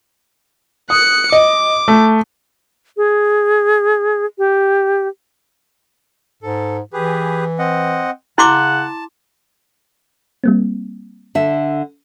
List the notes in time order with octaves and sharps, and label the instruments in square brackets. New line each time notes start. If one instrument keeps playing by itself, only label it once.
[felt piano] D#6 [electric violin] F#6 C#7
[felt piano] D#5 [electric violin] D6
[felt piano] A3
[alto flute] G#4
G4
[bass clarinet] G#2 [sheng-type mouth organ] A4
[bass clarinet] E3 [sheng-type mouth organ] G4 G#4 B4
[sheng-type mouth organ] C4 D#5 F#5
[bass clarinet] C#3 [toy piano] E4 C6 D6 [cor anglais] F#5 [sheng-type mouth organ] A5
[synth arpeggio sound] G3 A#3 C4
[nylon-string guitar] D3 E5